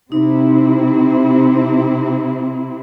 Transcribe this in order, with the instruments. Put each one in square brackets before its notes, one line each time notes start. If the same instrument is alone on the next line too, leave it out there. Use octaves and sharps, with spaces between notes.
[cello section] C3 C4 E4 [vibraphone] D#4